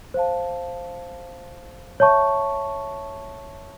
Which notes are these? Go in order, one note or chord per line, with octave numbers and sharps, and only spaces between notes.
C5 F5 A5
C#5 E5 A5 C#6